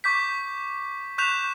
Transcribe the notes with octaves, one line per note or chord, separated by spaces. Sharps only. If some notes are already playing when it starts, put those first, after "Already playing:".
C#6 D6 G6 B6
C#6 F#6 G6 B6 E7 F7